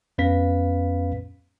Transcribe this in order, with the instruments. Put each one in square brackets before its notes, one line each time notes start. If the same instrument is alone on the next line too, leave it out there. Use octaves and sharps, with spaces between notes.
[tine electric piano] F2 B3 C#4 B4 F5 B6